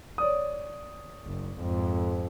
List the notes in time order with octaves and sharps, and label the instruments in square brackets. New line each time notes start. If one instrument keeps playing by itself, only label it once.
[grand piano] C#5 D5 D#6
[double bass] F#1
F2 G#2